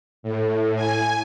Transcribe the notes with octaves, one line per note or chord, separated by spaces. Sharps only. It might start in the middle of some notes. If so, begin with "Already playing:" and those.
A2
G#5